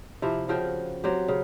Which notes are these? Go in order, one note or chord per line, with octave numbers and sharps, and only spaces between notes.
C3 F3 E4
C#3 F3 F#4 G5
F#3 C4 G4
C#3